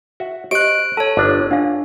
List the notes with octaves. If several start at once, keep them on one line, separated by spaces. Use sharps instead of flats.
F#4 E5
G4 C5 D#5 F#6 D7
A4 C#5 A5
G1 D4 D5
D4 F4 F5